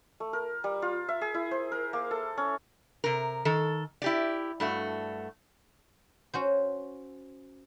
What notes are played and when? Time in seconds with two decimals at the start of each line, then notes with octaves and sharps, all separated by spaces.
0.20 A3
0.33 A#4
0.64 G3
0.82 F4
1.09 E5
1.21 G#4
1.34 E4
1.51 C5
1.72 A#4
1.93 A#3
2.11 A4
2.38 C#4
3.04 C3 A#4
3.45 D#3 A4
4.02 E4 G4 D5
4.60 G2 A3 F#4
6.34 C#4 F#4 C5